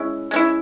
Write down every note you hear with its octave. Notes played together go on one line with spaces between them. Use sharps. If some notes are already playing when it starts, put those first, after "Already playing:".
Already playing: G#3 C#4 E4
G#3 C#4 E4